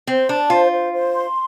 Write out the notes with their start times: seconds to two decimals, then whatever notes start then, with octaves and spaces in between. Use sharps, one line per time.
0.07 C4 C5
0.29 D4 A5
0.50 F4 C5
0.71 C5
0.93 C5
1.14 C6